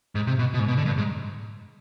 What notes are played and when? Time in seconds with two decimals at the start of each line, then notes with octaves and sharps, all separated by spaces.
0.15 G#2
0.27 C3
0.39 B2
0.54 B2
0.59 G#2
0.68 B2
0.77 D3
0.86 G2
0.97 G#2